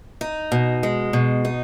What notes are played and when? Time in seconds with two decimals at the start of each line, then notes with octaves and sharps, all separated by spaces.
0.21 D#4
0.52 B2
0.83 G#3
1.13 B2
1.45 D#4